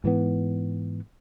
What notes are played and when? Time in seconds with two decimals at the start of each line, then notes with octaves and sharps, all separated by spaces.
0.04 G#2 E3 B3